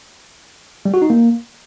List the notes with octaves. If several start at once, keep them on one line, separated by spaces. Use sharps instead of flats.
G3
F#4
D#4
A#3